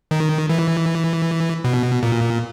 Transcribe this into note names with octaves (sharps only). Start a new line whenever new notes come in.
D#3
E3
B2
A#2